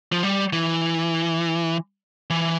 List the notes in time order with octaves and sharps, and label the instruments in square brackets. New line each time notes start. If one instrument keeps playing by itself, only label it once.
[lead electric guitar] F3
G3
E3
E3